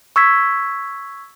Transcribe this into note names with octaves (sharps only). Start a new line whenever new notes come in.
C#6 E6 G#6 B6